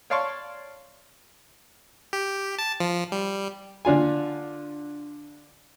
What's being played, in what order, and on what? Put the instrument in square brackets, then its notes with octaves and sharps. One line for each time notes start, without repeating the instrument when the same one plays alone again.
[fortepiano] C#5 D5 F5 A5 C6 C#6
[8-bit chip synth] G4
A5
F3
G3
[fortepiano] D3 D4 F4 G#5